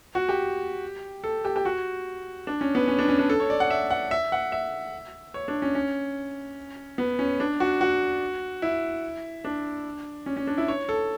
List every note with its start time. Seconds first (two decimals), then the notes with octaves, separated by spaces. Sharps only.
0.15 F#4
0.29 G4
1.24 A4
1.45 G4
1.56 G4
1.65 F#4
2.47 D4
2.61 C#4
2.75 B3
2.88 C#4
2.99 D4
3.08 C#4
3.19 D4
3.30 A4
3.40 C#5
3.50 D5
3.60 F#5
3.70 E5
3.91 F#5
4.11 E5
4.32 F#5
4.52 E5
5.34 C#5
5.48 D4
5.62 C#4
5.75 C#4
6.98 B3
7.19 C#4
7.40 D4
7.60 F#4
7.81 F#4
8.62 E4
9.45 D4
10.26 C#4
10.37 C#4
10.47 D4
10.58 E4
10.68 C#5
10.89 A4